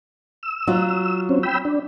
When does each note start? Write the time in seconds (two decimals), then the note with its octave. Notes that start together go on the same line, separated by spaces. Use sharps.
0.43 E6
0.67 F#3 F4
1.29 C4 C#4
1.43 G5 B5 E6
1.65 D4